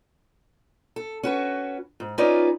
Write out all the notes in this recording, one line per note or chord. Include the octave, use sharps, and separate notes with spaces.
A4
C#4 F#4 B4
G#2
C#4 D#4 F4 B4 C#5 D5